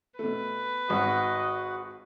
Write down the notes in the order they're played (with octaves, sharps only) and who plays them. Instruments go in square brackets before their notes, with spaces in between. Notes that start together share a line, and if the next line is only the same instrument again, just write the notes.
[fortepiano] B2 A3 [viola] B4
[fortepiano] G#1 [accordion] F#4 F#5 [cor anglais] D#5